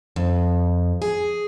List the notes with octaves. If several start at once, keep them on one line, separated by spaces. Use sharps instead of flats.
F2
G#4